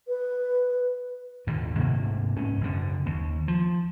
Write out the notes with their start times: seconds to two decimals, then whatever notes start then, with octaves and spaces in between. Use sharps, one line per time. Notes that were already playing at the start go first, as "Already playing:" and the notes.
0.08 B4
1.47 G#1 D#2 A#2 D3
1.79 D2 G#2 C3 A#3
2.36 G#2 C#4
2.61 F#1 F#2 D3
3.06 D#2
3.48 F3